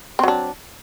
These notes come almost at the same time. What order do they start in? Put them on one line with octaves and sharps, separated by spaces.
C4 F#3 D4